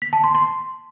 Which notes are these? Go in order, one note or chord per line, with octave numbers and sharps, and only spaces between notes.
B6
A5
C6
C6